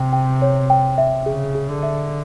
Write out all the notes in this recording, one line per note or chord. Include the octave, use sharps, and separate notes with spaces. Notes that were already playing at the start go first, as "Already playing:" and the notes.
Already playing: C3 G5
G5
C#5
G5
E5
C#3 G#4
G#4
D3
E5